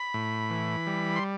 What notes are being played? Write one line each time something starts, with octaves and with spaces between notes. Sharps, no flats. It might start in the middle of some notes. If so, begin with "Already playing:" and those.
Already playing: B5
A2
E3
G3
C6